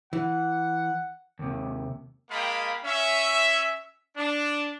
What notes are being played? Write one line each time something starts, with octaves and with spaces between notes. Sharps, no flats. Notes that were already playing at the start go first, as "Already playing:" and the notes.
E3 F#5
D#2 C3
G#3 A#3 F5 G5 A5 B5
C#4 E5
D4